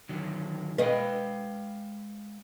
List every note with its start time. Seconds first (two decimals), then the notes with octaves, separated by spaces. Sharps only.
0.09 D3 D#3 F#3
0.78 G#3 B4 D#5 F5 G5